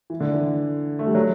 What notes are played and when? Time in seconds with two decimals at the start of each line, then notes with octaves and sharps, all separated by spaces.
0.10 E3
0.20 D3
0.31 E3
0.99 A3
1.07 G3
1.15 F#3